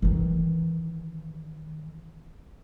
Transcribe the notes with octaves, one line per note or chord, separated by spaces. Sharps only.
D#3 E3